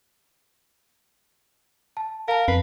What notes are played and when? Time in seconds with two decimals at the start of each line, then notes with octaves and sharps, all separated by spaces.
1.97 A5
2.28 A#4 F5 A5
2.48 F2 B4 C7